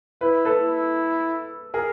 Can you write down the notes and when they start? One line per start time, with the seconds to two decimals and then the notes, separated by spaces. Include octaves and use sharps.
0.21 E4 B4
0.45 A4 B4
0.59 E4
1.74 G#4 A#4